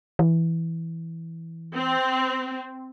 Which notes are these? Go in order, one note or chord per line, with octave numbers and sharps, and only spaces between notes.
E3
C4